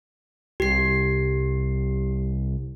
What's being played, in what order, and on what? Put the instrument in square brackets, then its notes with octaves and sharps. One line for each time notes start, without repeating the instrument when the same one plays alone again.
[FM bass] C2 [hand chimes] G4 C7